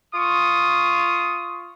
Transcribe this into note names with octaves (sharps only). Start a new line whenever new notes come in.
F4 C#6 D#6